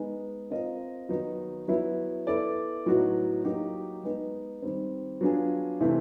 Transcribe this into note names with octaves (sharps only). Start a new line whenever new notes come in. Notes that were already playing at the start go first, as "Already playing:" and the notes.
Already playing: G#3 B3 D#4
C4 F4 A#4 D#5
D#3 F#3 B3 D#4
F#3 B3 E4
B3 E4 A4 D5
A2 F#3 B3 D#4 F#4
F#3 A#3 D#4 G4
G#3 B3 D#4
D#3 G3 C4
F#3 B3 D4 F4 G#4
C3 E3 A3 C4